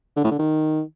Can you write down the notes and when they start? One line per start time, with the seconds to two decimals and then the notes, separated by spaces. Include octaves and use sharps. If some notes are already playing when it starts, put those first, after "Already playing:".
0.16 D3
0.24 A2
0.31 D3
0.39 D#3